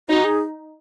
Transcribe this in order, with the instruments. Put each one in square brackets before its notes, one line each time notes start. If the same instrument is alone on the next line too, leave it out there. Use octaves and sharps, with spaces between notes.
[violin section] D#4 [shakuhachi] F#4
[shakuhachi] G#4